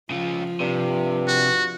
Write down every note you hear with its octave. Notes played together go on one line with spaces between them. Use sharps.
C#3 F3 F4
G2 C3
F#4